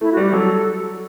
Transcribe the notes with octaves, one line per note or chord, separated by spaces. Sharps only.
A3 E4
F#4
G3
G4
F#3 A4